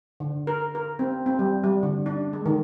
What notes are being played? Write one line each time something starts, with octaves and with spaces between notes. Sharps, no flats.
D3
A#4
A#4
C4
C4
G3
G3
D3
D4
G#3
D#3